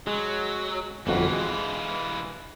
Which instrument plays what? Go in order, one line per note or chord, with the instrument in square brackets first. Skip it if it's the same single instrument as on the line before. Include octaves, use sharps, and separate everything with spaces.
[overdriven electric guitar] F#3 [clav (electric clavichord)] G#3
[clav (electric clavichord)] G1 F2 F#4 [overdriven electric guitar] E3 F4
[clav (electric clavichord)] G#3